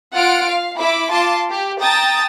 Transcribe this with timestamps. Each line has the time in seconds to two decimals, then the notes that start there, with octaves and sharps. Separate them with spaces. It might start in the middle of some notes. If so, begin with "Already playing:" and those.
0.16 F4 F#5 F6 D7
0.48 F5
0.79 E4 B5 D6
1.11 F4 A5 C6 D6
1.50 G4
1.82 G5 A5 A#5 D#6 A6